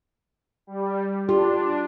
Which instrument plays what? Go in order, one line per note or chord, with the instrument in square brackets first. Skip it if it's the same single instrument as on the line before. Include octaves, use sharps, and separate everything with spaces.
[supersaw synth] G3
[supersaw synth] D4 [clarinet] F4 [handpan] G4